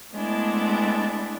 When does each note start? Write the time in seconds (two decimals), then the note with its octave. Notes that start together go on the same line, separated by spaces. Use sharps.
0.13 G#3 A3 B3 C4 D4 E4